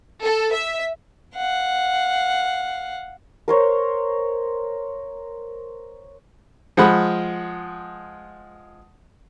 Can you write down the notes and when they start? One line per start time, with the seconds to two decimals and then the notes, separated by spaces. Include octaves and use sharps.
0.23 A4
0.53 E5
1.36 F5 F#5
3.48 A#4 C5 C#5
6.77 F3 G#3 F#5 B5